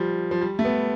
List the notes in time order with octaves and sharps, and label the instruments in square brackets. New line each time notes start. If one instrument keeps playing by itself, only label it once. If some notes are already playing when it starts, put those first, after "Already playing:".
Already playing: [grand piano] F3 G3
F3
G3
A3
B3